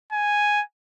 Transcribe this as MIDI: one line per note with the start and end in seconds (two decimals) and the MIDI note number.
0.13 0.62 80